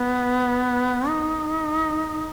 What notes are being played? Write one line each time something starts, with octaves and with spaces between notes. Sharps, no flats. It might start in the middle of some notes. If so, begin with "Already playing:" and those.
Already playing: B3
D#4